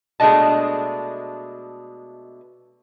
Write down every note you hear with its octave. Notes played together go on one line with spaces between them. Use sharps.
B2 G#3 A3 D4 D#5 A5